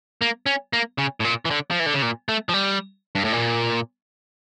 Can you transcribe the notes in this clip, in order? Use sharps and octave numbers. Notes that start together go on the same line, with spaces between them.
A#3
C#4
A#3
C#3
A2
A#2
E3
D3
F3
E3
D3
C#3
A#2
A3
F3
G3
G2
A2
A#2